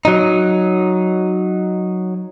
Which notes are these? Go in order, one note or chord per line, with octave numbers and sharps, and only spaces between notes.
F#3 D#4